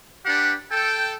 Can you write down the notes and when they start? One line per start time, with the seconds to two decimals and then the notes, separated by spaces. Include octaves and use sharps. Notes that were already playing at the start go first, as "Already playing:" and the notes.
0.25 D4 G4 B4 F#5
0.71 A4 G5